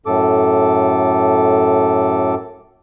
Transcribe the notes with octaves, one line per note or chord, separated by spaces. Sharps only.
F#2 A2 A4 D6